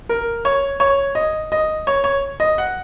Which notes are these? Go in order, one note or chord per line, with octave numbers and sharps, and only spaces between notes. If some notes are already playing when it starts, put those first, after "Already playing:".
A#4
C#5
C#5
D#5
D#5
C#5
C#5
D#5
F#5